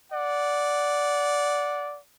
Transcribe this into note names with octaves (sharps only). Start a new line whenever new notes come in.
D5 F#5